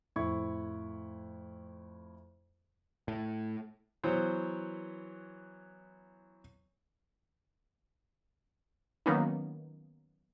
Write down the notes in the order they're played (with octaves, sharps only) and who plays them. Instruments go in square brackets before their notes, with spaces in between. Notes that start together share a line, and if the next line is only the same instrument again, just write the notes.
[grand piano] F2 A2 E4 C#6 G#6
[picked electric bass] A2
[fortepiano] E3 F#3 B3 C5 C#5
[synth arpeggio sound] D#3 F#3 A#3 B3 C#4 D#4